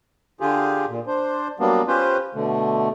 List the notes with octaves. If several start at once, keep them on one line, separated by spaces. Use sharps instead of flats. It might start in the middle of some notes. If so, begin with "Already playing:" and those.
D3 F4 G4 G#4
A#2
D4 C5
F#3 G3 A#3 B3 D4
C#4 F4 G4 B4 C5
B2 D3 A3